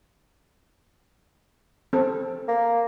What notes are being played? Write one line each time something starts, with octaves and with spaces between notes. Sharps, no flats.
C4 A4
A#3